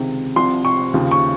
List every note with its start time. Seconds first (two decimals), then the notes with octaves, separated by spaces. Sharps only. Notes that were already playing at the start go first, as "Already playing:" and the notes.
Already playing: C#2 C3 D#3
0.36 C2 C3 F3 C6
0.65 C#6
0.94 D#2 C#3 F3
1.11 C#6